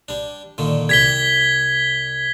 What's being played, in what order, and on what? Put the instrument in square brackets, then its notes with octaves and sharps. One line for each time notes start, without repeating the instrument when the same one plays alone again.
[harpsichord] G3 D4
A#2 D3 D#3
[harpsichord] C2 G4 [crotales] G#6 B6 G7